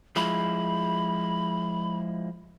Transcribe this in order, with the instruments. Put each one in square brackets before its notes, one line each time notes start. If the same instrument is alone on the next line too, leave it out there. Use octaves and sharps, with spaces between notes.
[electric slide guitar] F3 G#3 E4 [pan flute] B5